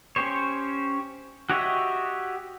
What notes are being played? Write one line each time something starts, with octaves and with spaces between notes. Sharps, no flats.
C#4 G4 C5 C#5
F#4 G4 C#5 D#5 E5